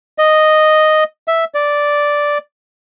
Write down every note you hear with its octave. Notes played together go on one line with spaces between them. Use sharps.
D#5
E5
D5